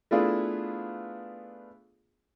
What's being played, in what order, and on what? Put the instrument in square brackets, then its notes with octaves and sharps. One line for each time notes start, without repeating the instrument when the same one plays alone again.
[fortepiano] A3 B3 D4 E4 F4 G#4